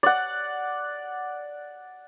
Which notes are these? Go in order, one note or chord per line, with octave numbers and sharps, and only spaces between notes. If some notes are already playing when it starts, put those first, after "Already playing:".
D5 F#5